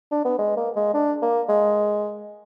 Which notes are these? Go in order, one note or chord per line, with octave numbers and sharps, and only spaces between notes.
D4
B3
G#3
A#3
G#3
D4
A#3
G#3